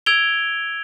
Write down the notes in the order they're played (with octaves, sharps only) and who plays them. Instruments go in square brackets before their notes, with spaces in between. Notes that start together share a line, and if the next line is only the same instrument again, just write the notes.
[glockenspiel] E6 G#6 D7 F7 G7